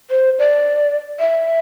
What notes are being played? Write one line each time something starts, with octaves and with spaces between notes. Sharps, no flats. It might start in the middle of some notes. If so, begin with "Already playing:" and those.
C5
D5
E5